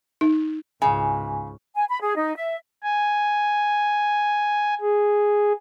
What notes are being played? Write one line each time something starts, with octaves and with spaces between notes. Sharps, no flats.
D#4
C#2 G#2 C#3 G#5
G#5
B5
G#4
D#4
E5
G#5
G#4